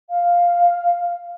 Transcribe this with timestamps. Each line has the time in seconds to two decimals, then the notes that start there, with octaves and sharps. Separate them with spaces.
0.10 F5